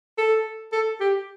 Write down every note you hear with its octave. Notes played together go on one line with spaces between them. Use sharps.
A4
A4
G4